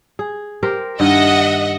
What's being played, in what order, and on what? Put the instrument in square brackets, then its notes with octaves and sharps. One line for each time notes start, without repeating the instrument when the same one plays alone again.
[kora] G#4
G4 A#4 C5
[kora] G2 D#3 [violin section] D#5 E5 F#5